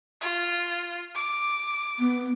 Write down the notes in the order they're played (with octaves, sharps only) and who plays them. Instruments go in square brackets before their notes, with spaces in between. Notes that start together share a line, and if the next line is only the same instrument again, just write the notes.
[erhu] F4
D6
[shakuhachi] B3